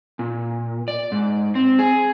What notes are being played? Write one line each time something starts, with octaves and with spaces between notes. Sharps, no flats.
A#2
D5
G#2
C4
G#4